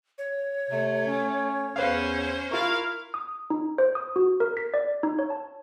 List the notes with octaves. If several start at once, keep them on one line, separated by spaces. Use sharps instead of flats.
C#5
C3 A3
C#4
E2 C#4 B4 C5 F5
E4 F4 A#4 F5 C#6
D#6
D#4
C5
D#6
F#4
A#4
B6
D5
D#4
C#5
A5